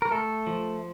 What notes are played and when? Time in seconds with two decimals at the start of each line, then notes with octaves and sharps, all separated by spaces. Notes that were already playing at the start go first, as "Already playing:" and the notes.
0.02 A#4
0.11 A3 A4
0.47 F3